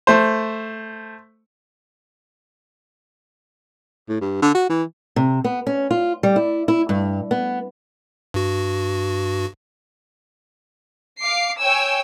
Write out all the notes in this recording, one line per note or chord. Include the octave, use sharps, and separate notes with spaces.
A3 C5
A2
G2
D3
F#4
E3
C3
B3
C#4
F4
G3
E4
E4
G2
B3
G2 F#4
F5 D6 C7
C#5 G5 G#5 E6